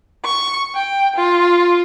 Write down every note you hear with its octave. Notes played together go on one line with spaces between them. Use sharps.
C#6
G5
F4